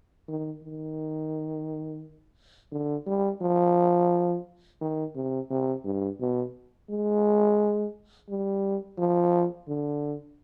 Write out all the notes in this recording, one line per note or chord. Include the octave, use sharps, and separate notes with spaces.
D#3
D#3
D3
G3
F3
D#3
C3
C3
G2
B2
G#3
G3
F3
D3